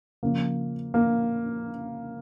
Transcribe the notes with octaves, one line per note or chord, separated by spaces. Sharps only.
C#3 F3 A#3
A#3